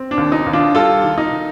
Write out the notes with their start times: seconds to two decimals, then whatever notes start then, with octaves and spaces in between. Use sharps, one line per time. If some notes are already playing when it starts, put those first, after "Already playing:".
Already playing: C4
0.11 D4
0.17 D#2
0.32 D#4
0.46 D#2
0.53 D4 F4
0.75 G3 F4 A4
1.03 D#3
1.18 D#4
1.31 D#3